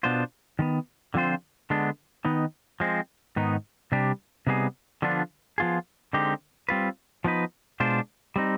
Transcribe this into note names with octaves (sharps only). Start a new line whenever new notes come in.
B2 B3 D4 F4 C5
D#3 G#3 B3
D3 F3 C4 F4 C5
D3 G#3 B3 D4
D#3 B3 D#4 B4
F3 G#3 C4
G#2 D#3 B3 D#4
C3 G3 D4 G4
C3 G3 B3 D#4 G#4
D3 F3 B3 D4 F4
F3 B3 F4 G#4
D3 G#3 C4 D#4 G4
G3 C4 F4 B4
F3 B3 D#4 B4
B2 G#3 D4 F4 C5
G3 C4 D#4